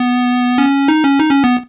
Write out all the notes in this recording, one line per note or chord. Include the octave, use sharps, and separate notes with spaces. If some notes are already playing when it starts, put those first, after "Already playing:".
Already playing: B3
C#4
D#4
C#4
D#4
C#4
B3